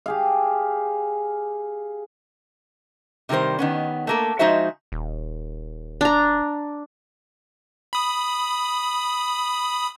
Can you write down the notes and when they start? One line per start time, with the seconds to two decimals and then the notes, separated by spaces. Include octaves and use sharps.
0.06 G4 G#4 F5
3.29 C3 D#3 G3 A#4 C5
3.59 D#3 B3 C#4
4.07 A3 A#3 A4
4.39 F3 G#3 D#4 F#4 C5 E5
4.92 D#1
6.01 D4 A#5
7.93 B5 D#6